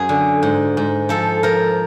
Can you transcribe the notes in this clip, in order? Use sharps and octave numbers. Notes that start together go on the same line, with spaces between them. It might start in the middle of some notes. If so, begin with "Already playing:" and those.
Already playing: F#2 G#4
D3
G#2
G#2
F3 A4
F3 A#4